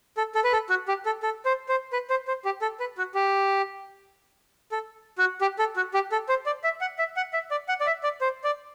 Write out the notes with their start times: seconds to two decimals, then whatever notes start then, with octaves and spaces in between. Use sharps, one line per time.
0.17 A4
0.35 A4
0.44 B4
0.53 A4
0.69 F#4
0.88 G4
1.06 A4
1.23 A4
1.45 C5
1.69 C5
1.93 B4
2.10 C5
2.28 C5
2.45 G4
2.62 A4
2.80 B4
2.98 F#4
3.15 G4
4.72 A4
5.18 F#4
5.41 G4
5.59 A4
5.76 F#4
5.94 G4
6.12 A4
6.29 C5
6.46 D5
6.64 E5
6.81 F#5
6.99 E5
7.16 F#5
7.33 E5
7.51 D5
7.68 F#5
7.80 D5
7.87 E5
8.03 D5
8.21 C5
8.44 D5